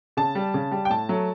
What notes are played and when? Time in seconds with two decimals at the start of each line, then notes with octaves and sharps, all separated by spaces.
0.17 C#3 A5
0.35 G3
0.54 C#3
0.71 G3
0.85 G5
0.90 A2 A5
1.09 F#3 A3